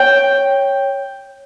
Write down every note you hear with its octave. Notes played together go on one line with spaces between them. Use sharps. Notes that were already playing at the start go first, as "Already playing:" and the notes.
Already playing: C#5 G5